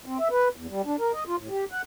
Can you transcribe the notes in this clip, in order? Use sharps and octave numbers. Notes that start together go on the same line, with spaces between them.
C4
E5
B4
E2
G3
D4
A#4
D#5
F4
A2
G4
F#5